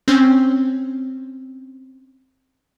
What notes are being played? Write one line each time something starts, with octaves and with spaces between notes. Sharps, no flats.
C4 C#4